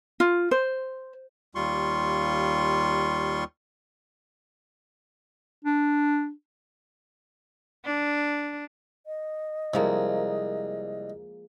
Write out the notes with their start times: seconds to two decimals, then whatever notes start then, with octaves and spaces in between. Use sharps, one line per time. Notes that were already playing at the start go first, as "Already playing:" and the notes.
0.20 F4
0.51 C5
1.55 D#2 G3 F4 C6 C#6
5.65 D4
7.85 D4
9.07 D#5
9.74 C2 F3 G#3 A#3